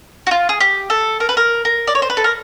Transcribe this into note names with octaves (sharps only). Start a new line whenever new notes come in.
F#4
F4
G#4
G4
A4
A#4
B4
A#4
A#4
D5
C#5
C5
B4
A4
A#4